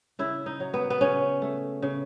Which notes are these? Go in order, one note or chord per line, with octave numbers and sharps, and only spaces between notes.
C#3 E4
D#4
F#3
B3
B3
C#3 C#4
A3
C#3